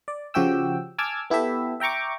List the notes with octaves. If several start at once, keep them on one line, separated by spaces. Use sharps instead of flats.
D5
C#3 F3 F#4 G4 G5 E6
G#5 A5 D6 E6 F6 G#6
B3 E4 G4 A4 E5
E5 G5 A#5 C#6 D6